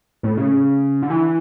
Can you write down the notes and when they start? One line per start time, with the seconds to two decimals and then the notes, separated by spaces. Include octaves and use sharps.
0.23 A2
0.37 C#3
1.02 D3
1.10 E3